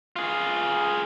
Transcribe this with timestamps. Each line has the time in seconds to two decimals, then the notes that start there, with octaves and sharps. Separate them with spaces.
0.16 F4 G#4